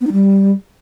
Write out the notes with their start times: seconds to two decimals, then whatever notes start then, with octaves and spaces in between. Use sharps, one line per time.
0.01 B3
0.07 D#4
0.12 G3